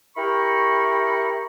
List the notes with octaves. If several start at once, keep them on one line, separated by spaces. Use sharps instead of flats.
E4 G4 A#4 A#5 B5 C#6